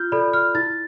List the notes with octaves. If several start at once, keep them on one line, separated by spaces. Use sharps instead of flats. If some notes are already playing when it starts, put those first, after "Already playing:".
Already playing: F4 F6 G6
A4 D5 B5
F6
E4 A6